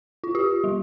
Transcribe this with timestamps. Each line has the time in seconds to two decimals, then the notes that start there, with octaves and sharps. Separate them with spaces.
0.24 F4
0.35 F4 G4
0.64 G3